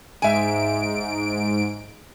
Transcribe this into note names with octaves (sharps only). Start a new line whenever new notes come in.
G#2 E5 G#5 D7